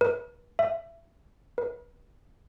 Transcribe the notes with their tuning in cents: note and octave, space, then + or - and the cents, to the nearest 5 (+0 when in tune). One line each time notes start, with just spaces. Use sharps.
B4 -40
E5 +25
B4 -40